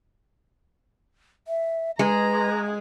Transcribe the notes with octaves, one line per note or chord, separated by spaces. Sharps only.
E5
G#3 B4 A#5